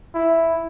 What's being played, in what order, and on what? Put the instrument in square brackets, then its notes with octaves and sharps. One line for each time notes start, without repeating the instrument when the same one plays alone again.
[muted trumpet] E4